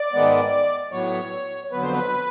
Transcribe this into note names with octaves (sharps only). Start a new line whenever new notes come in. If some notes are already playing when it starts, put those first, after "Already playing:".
Already playing: D5
G#2 D#3 G#3 B3
A2 F#3 B3 C#5
F2 D3 F#3 B3 B4
C5
B4